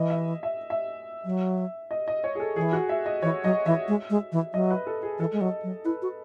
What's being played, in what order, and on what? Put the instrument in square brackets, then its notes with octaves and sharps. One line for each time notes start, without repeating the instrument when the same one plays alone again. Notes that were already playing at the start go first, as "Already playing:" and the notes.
Already playing: [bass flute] E3 [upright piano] D#5
[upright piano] E5
E5
E5
[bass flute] F#3
[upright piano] D#5
D#5
C#5
G#4
A4
[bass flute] E3 [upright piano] G#4
[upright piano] F#4
E5
D#5
[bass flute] E3 [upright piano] C#5
[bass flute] F#3 [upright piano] D#5
[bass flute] E3 [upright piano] E5
[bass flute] G#3
G#3
E3
[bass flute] F#3 [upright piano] D#5
[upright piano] B4
A4
G#4
[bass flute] E3 [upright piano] A4
[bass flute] G#3
[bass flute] F#3 [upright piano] D#5
[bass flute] F#3
[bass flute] E4 [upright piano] B4
[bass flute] F#4